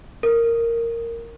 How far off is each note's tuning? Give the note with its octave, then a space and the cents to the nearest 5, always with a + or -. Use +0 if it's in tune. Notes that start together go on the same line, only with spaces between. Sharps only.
A#4 -10